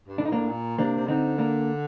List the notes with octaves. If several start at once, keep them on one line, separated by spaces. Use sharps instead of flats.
G2
A2 D4
D#4
A#3 D4
A#2
C3 A#3 D4
C3
D3 C4 D#4
A#3 D4